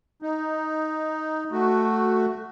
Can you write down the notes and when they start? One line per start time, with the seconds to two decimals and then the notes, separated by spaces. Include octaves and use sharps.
0.22 D#4
1.52 A3 F#4